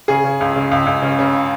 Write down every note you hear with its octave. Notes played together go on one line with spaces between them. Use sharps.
C#3 G#4
C#3
C#2
C#3
C#2
C#2
C#3
C#3